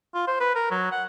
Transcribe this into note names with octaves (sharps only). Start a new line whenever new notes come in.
F4
C5
B4
A#4
F#3
F#5